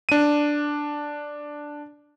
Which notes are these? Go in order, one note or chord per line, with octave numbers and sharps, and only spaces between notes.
D4 D#7